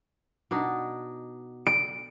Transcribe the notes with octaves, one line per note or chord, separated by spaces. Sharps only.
B2 D4 D#4
D7